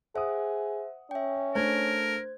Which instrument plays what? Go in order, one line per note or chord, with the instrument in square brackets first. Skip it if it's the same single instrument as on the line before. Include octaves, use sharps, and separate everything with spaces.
[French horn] G#4 [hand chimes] C5 E5 [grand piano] F#5 D#6
[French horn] C#4 [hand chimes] E5 G5
[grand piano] A3 D4 A4 [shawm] A#4 [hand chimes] C5 G#6